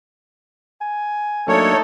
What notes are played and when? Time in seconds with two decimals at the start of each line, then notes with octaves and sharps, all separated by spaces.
0.81 G#5
1.48 F#3 A3 A#3 D4 D#4 A4 C#5